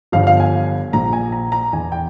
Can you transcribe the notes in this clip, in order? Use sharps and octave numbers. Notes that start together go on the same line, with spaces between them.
G1 G2 F3 F5
F5
G#5
A#1 A#2 F3 A#5
G#5
A#5
A#5
E2 E3 G#5
G5